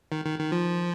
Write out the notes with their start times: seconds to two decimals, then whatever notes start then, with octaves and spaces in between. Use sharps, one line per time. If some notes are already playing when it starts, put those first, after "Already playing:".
0.12 D#3
0.25 D#3
0.39 D#3
0.52 F3